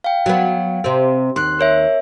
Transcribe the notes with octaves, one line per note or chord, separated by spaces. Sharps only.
F5 G5
F#3 B3
C3 C4
D#2 C6 F#6
A#4 C#5 E5